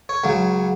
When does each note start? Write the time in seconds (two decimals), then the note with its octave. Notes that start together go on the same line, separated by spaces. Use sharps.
0.09 C#5
0.24 C#2 C#3 F#3